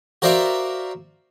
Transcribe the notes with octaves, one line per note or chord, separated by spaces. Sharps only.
F#4 A#4 C5 D5 E5 F5